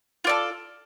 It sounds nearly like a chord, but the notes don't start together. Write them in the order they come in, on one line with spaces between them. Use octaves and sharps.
F4 D5 A4